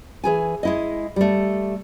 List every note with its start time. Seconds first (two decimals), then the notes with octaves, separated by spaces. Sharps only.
0.24 E3 G#4 G#5
0.63 G#3 E4 D#5
1.16 G3 A3